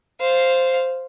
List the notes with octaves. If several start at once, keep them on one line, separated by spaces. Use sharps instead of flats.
C5 F5